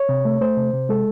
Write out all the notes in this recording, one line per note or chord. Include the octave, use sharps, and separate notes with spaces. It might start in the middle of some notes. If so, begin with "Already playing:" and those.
Already playing: C#5
C3
A3
A3 C5
C3
C3
G#3 A4